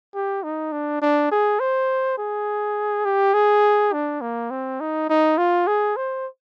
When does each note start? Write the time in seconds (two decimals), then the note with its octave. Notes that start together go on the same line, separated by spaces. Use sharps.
0.15 G4
0.43 D#4
0.72 D4
1.02 D4
1.31 G#4
1.60 C5
2.18 G#4
3.05 G4
3.34 G#4
3.93 D4
4.21 A#3
4.51 C4
4.81 D#4
5.10 D#4
5.38 F4
5.67 G#4
5.96 C5